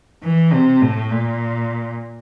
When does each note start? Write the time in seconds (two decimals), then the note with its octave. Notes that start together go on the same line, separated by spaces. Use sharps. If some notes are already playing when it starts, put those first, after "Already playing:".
0.23 E3
0.53 C3
0.82 A2
1.11 A#2